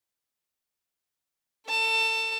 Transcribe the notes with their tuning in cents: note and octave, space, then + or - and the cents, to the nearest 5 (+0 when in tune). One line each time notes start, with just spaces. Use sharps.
A4 +25 A5 +25